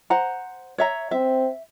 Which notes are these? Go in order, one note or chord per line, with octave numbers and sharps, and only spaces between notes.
C5 F#5 A#5
C#5 E5 A#5
C4 E5